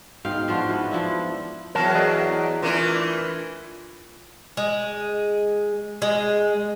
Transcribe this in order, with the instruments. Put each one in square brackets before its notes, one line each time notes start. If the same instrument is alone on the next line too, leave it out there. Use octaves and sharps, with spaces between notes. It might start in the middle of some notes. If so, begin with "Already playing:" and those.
[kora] G#2 B2 F5 G5
F3 D4 F4 F#4
E3 B3
F3 D4 E4
[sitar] E2 F#3 [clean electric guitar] A#4 A5
[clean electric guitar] G#4 D5 D#5
[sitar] E3 A3 D4 [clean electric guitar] F4 A#4
[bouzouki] G#3
G#3